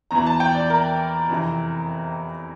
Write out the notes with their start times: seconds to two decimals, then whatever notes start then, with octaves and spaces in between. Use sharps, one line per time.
0.11 E2 E3 A#5
0.26 A5
0.40 G5
0.55 D5
0.70 A#4
1.29 F2 C3 E3